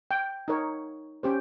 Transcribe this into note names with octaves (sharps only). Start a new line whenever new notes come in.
G5
D#4 A#4 C#5
C#4 G4 C5